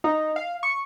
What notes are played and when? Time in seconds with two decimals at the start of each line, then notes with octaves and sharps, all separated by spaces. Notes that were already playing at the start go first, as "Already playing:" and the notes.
0.04 D#4
0.36 F5
0.63 C#6